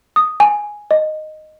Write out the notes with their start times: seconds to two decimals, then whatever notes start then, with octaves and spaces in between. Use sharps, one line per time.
0.16 D#6
0.40 G#5
0.91 D#5